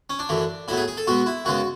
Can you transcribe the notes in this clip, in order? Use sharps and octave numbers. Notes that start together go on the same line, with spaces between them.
C#4
D4
F#2 E3 A3
A2 F#3 B3 E4
G#4
G#4
A4
B2 G#3 B3 F#4
E4
F#2 C#3 G#3 B3 F#4